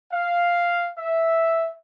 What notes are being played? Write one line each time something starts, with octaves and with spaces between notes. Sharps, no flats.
F5
E5